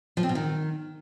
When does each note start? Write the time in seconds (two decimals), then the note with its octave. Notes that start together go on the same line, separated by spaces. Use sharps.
0.17 F3
0.23 C4
0.29 B2
0.35 D#3